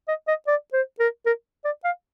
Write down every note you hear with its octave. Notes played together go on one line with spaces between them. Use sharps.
D#5
D#5
D5
C5
A#4
A#4
D5
F5